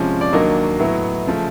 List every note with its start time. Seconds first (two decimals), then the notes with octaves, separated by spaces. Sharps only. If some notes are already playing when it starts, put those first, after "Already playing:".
Already playing: C3 F3 G#3 C#4
0.21 D5
0.33 D#2 D#3 F#3 A#3 D4 D#5
0.79 A2 F#3 B3 E4
1.27 C#3 F3 A3